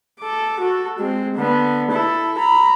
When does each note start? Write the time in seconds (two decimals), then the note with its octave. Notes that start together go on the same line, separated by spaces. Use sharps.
0.20 A4 D6
0.60 F#4 A4
0.99 G#3 C4
1.35 D3 B3
1.91 E4 A4
2.38 A#5 B5